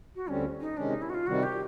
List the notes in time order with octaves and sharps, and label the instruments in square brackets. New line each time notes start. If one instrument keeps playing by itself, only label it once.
[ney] F#4
[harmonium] D2 D3 G3 C4 [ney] C#4
[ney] D#4
[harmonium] C3 D#3 G#3 C#4 [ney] D4
[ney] D#4
E4
F#4
F4
[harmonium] C3 D#3 G3 [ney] F#4
[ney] G4